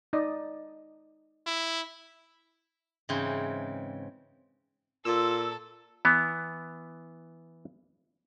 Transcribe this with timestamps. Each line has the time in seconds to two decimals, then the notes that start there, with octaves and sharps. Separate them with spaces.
0.13 D#4 D5 D#5
1.47 E4
3.09 G#2 C#3 E3 C4
5.05 A#2 F4 A4 E6
6.05 E3 B3